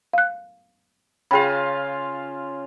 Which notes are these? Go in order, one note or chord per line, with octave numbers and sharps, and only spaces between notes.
F5 F#6
C#3 F4 G#4 F5 G5 B5